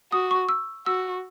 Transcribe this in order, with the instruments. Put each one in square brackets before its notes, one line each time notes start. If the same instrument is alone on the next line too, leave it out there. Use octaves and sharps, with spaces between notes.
[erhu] F#4 [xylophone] D#6
[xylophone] C#6
E6
[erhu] F#4 [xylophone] E6